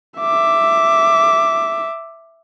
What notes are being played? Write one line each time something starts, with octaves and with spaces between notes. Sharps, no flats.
E5 D6